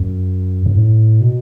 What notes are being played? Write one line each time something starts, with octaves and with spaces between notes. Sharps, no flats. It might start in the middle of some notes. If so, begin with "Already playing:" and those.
Already playing: F#2
F#2
A2
B2